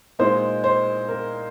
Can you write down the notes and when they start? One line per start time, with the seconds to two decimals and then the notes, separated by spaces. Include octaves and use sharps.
0.19 A#2 G#3 D#4 C5
0.64 C5
1.09 A#4